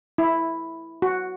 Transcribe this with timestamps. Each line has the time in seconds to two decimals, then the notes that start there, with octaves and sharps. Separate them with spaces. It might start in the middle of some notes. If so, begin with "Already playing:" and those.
0.18 E4
1.02 F#4